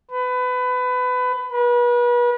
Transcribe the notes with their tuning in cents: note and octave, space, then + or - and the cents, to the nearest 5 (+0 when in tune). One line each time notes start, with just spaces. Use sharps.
B4 +25
B4 -35